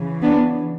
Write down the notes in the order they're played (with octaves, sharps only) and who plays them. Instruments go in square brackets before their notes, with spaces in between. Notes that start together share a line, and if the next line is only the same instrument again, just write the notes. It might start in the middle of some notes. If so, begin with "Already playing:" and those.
Already playing: [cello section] C#3 E3
B3 D4